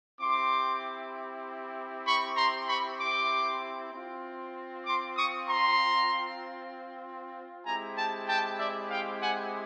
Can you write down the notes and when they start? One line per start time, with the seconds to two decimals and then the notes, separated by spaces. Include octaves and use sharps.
0.19 C4 E4 G4 C6 D6
2.05 B5 C#6
2.37 A#5 C6
2.67 B5 C#6
2.99 C6 D6
3.92 C4 F4
4.86 C6 D6
5.16 C#6 D#6
5.47 A#5 C6
7.65 G#3 C4 E4 G4 G#5 A#5
7.96 G5 A5
8.28 G5 A5
8.58 D5 E5
8.89 F5 G5
9.21 F#5 G#5